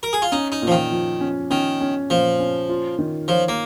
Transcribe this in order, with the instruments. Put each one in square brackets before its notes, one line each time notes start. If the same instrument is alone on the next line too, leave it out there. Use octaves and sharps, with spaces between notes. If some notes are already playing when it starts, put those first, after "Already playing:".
[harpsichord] A#4
G#4
F4
[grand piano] C#4 [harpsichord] D#4
[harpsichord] D#4
[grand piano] A#2
[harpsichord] F3
D#3
[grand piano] F3
C#4
[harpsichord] D#3 [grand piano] C#4
[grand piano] C#4
[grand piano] A#2 [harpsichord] F3
[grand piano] C#4
F4
D#3
[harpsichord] F3 [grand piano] C#5
[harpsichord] A#3